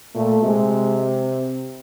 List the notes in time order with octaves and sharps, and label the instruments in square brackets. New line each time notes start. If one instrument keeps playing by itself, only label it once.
[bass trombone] A#2 [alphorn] A3
[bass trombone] C3 [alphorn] G#3